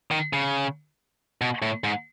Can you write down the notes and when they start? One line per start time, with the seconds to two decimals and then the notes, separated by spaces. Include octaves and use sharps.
0.11 D#3
0.33 C#3
1.42 B2
1.62 A2
1.84 G#2